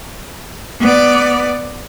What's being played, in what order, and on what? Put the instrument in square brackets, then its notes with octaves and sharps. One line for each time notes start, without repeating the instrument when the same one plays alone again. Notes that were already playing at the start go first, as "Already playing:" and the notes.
[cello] B3 D5